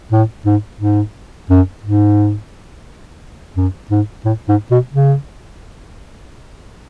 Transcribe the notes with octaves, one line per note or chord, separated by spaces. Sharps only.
A2
G#2
G#2
F#2
G#2
F#2
G#2
A2
G#2
B2
C#3